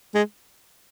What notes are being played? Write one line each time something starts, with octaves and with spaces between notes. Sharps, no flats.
G#3